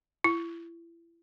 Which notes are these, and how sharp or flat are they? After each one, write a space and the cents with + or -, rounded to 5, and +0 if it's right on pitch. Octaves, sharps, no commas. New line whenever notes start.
E4 +30